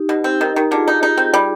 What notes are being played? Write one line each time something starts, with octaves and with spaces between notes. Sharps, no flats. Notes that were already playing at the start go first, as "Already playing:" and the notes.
Already playing: D#4 G4
B2
C4
D#3
D#3
D3 F4 G#4
D#4
D#4
C4
G3